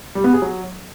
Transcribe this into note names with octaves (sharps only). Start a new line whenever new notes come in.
G3
B3
G#4
F#3